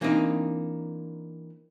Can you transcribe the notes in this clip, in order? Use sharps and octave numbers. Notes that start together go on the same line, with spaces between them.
E3 A#3 C4 D4 D#4